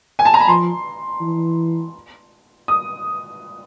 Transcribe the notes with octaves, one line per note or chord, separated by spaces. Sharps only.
G#5
A5
A#5
B5
F3 C6
E3
D#6